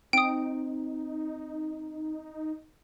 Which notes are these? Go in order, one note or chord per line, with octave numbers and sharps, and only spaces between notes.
C4 D#4 G5 D#6 D7